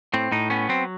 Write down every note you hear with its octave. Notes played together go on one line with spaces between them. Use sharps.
A2 C4
A2 D#4
B3 C#4
F#3 C4